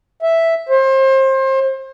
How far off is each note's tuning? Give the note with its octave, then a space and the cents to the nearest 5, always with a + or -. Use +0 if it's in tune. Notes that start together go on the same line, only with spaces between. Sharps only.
E5 +0
C5 +30